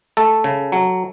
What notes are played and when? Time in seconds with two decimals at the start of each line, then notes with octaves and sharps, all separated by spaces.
0.17 A3 A4
0.44 C#3
0.72 F#3